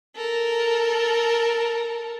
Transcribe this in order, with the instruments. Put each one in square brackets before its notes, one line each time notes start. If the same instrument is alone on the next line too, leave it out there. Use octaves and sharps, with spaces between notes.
[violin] A4 A#4